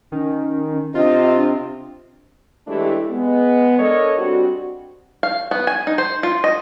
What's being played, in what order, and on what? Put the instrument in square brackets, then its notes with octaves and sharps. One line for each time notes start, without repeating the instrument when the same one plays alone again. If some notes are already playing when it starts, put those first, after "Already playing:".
[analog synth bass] D#3 [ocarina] C#4
[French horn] C3 [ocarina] D4 [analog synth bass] F4 [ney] D#5
[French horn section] E3 G#3 A3 D4 E4 G4
G#3 B3
D4 A4 A#4 C#5 D#5
G3 C4 D4 F#4
[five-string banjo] F5
B3
G#5
D#4
C5
F4
D#5